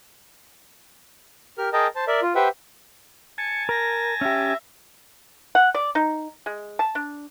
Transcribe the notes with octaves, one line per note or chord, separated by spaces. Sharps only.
G4 A#4 F6
G#4 A#4 D#5 G5 A5 A#5
C5 A5
A#4 D5 E5
F4
G4 B4 C5 E5 F#5 G5
G#5 A5 C#7
A#4 A#6
C#4 G4 E5
F#5
D5
D#4
G#3
A5
D4